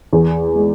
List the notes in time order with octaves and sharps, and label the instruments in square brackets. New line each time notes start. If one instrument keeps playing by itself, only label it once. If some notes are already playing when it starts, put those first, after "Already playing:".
[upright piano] E2
G#3